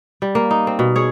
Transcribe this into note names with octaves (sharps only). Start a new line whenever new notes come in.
G3
A#3
D#4
C4
B2
G#4 C#5